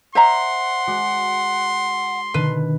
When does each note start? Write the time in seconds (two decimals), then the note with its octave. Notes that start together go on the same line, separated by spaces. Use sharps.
0.15 C5 D5 E5 F#5 A#5 C6
0.87 G#3 F#4 D6
2.34 B2 D3 D#3 B4